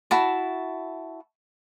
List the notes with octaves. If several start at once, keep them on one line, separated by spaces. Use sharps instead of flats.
E4 F#4 A5